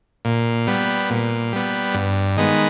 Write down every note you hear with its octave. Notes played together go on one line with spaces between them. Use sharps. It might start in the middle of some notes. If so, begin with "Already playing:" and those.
A#2
G3 B3
A#2
G3 B3
G2
D#3 G#3 B3